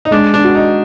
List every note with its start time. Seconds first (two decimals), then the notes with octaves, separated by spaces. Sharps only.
0.05 D#4
0.11 G#3 D4
0.34 D4
0.44 F#4
0.55 D#4